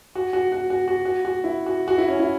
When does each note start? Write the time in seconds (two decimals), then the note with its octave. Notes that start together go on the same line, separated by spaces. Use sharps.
0.15 F#4
0.33 F#4
0.52 F#4
0.70 F#4
0.88 F#4
1.05 F#4
1.25 F#4
1.44 E4
1.66 F#4
1.88 F#4
1.98 E4
2.08 C#4
2.19 E4